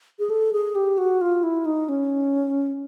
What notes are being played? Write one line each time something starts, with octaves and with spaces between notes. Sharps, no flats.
G#4
A4
G#4
G4
F#4
F4
E4
D#4
C#4